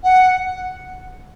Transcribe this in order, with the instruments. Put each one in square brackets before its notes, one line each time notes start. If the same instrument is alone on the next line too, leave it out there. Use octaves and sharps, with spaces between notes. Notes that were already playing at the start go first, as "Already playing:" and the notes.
[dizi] F#5